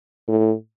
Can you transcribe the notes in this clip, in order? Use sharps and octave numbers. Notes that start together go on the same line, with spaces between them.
A2